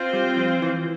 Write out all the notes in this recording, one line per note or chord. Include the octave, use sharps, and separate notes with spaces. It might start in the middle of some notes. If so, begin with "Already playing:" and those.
Already playing: C4 F4 C5
G3
F3
E3